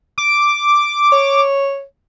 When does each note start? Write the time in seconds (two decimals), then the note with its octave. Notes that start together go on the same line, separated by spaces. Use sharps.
0.18 D6
1.12 C#5